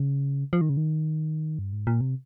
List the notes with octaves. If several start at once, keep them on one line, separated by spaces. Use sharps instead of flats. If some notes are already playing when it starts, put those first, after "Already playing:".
Already playing: C#3
F3
D#3
C#3
D#3
G2
G#2
A#2
C3